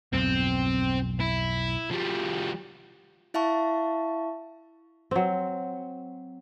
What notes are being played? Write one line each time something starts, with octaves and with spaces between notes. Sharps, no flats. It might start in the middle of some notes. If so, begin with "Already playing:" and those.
B1 F2 G#2 C4
E4
F3 G3
E4 E5 F5 A5 C#6
F#3 C4